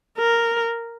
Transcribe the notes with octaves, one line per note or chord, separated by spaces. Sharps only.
A#4